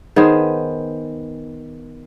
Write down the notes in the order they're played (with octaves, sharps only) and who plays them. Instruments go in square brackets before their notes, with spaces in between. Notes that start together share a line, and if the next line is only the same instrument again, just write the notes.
[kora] D#3 B3 G#4 C5